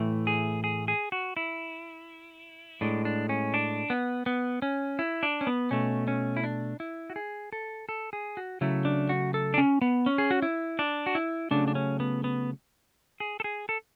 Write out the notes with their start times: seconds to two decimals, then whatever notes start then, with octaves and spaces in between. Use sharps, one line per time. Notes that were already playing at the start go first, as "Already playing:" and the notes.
Already playing: A2 E3 A3
0.27 G#4
0.64 G#4
0.88 G#4
1.12 F#4
1.37 E4
2.81 A2 G#3 D4
3.05 D4
3.29 C#4
3.54 D4
3.90 B3
4.26 B3
4.62 C#4
4.99 E4
5.23 D4
5.41 C#4
5.47 B3
5.71 B2 A3 C#4
6.08 C#4
6.37 E4
6.44 D4
6.80 E4
7.10 F#4
7.16 G#4
7.53 A4
7.89 A4
8.13 G#4
8.37 F#4
8.61 C#3 F#3 A3 E4
8.85 D4
9.09 F#4
9.34 A4
9.54 D4
9.58 C#4
9.82 B3
10.06 C#4
10.18 G#4
10.31 F#4
10.42 E4
10.79 D4
11.06 F#4
11.15 E4
11.51 C#3 F#3 A3 D4
11.68 D4
11.75 C#4
12.00 B3
12.24 B3
13.20 G#4
13.40 A4
13.44 G#4
13.69 A4